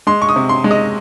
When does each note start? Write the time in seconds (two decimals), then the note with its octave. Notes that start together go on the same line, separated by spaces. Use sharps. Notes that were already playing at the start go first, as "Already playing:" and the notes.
0.07 G#3 C6
0.22 C#6
0.29 D#6
0.36 C3
0.49 C6
0.64 G#3
0.71 D#5